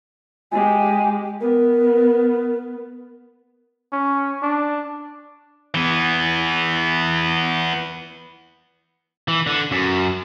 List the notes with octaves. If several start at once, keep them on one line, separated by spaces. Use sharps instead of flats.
G#3 G4 G#5
B3 A#4
C#4
D4
E3 B3
E3
D3
F#2